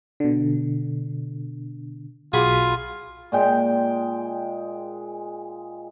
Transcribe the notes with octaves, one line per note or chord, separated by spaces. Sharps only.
B2 D3
B1 F4 F#4 G#4 B5 C#6 D6
A#2 G#3 G5